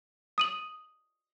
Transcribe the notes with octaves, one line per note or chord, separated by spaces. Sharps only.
D#6 D#7 F#7